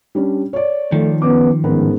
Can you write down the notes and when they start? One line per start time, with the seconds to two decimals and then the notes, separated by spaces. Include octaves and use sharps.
0.15 G3 C#4 D4
0.53 C#5 D5
0.92 D#3 F3 A3
1.22 B3 C#4 D6
1.64 A1 G#2 B3 A#4